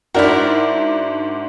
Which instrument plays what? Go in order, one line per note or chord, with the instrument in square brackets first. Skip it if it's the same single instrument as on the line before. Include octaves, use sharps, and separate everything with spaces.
[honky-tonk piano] G#2 D4 F#4 [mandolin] E4 A#4